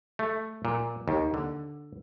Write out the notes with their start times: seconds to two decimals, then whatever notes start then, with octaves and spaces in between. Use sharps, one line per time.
0.19 A3
0.65 A#2
1.08 D#2
1.34 D3